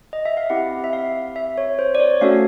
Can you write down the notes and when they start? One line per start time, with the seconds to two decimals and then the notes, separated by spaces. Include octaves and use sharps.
0.13 D#5
0.25 E5
0.37 F5
0.50 C4 E4 G4 F#5
0.84 E5
0.93 F5
1.36 E5
1.58 C#5
1.79 C5
1.95 D5
2.00 C#5
2.21 A3 C#4 F#4 A4 F5